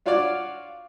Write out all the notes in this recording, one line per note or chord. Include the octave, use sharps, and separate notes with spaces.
D4 F4 F#4 C#5 D5